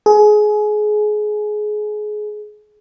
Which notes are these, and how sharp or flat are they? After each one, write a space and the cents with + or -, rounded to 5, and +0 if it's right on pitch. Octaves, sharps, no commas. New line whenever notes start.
G#4 +25